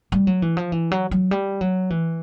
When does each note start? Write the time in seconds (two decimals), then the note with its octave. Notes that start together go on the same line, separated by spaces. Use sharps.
0.12 G3
0.27 F#3
0.42 E3
0.57 F3
0.72 E3
0.92 F#3
1.11 F#3
1.31 G3
1.61 F#3
1.90 E3